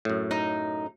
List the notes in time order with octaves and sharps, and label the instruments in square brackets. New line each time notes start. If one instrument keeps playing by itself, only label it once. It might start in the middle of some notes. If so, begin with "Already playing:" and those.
[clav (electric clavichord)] F#2 A2
[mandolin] D#4